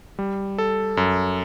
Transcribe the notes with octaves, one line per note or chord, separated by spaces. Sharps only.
G3
A4
F#2